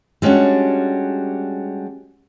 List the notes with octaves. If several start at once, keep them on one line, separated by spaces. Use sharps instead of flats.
G3 G#3 C#4 D4 F#4